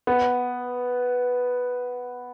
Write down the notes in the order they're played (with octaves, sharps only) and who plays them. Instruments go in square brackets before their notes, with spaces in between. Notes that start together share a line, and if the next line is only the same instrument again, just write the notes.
[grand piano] B3